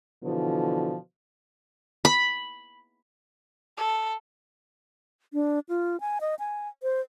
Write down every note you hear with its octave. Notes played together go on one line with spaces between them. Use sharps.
B2 D3 E3 F3
B5
A4
D4
F4
G#5
D#5
G#5
C5